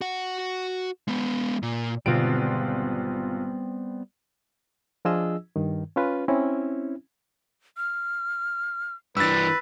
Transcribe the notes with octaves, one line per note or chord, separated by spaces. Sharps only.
F#4 F#5
G#3 B3
A#2
G#1 B2 D3 G3 B3 C4 F4 D7
F3 D4 F4 G#4 D#5 E6
G2 D#3
C#4 F4 B4
C4 C#4 E4
F6
G2 E3 B4 E6 A6